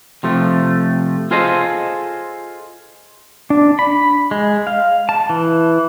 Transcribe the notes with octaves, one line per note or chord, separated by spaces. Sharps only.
C3 F3 A3
F4 G#4 A4 C5 D#5
D4
B5
G#3
F5
A5
E3